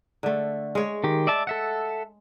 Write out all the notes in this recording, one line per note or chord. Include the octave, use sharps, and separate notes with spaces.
D3 A3
G#3 C#5
D#3 G4
D5 E5 A5
A4 E5 F#5